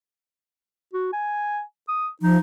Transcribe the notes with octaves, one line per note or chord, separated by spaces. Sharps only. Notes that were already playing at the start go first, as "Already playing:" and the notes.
F#4
G#5
D#6
F3 D#4